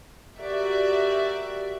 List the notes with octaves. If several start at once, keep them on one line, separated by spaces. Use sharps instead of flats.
F#4 G4 A#4 D5 E5